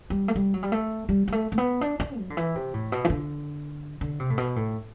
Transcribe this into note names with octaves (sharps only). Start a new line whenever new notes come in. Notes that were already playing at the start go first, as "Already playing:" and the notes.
G3
A3
G3
F#3
G3
A3
G3
G3
A3
A3
B3
D4
D4
F#3
D3
E3
C3
A2
B2
E3
D3
D3
C3
A2
B2
A2